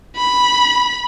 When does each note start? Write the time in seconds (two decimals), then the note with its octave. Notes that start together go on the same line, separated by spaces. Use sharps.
0.17 B5